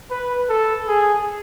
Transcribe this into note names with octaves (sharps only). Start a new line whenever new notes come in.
B4
A4
G#4